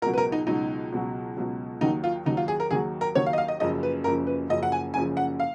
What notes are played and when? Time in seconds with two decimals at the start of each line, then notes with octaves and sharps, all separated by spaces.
0.02 C#2 A#4
0.05 B2 F#3
0.13 B4
0.18 A#4
0.32 D#4
0.47 C#2 B2 F#3 D#4
0.92 C#2 B2 F#3
1.37 C#2 B2 F#3
1.81 D#2 D#3 F#3 D#4
2.04 F4
2.26 D#2 D#3 F#3 D#4
2.37 F4
2.48 G#4
2.60 A#4
2.71 D#2 D#3 F#3 G#4
3.01 A#4
3.15 D#2 D#3 F#3 C#5
3.26 F5
3.33 D#5
3.38 F5
3.48 D#5
3.60 F#1 F#2 C#3 F3 D#5
3.83 B4
4.04 F#1 F#2 C#3 F3 A#4
4.27 B4
4.49 F#1 F#2 C#3 F3 D#5
4.63 F#5
4.72 G#5
4.94 F#1 F#2 C#3 F3 G#5
5.17 F#5
5.40 F5